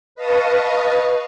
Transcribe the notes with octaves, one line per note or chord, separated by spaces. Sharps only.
B4 D#5 F5 A5 C#6 D#6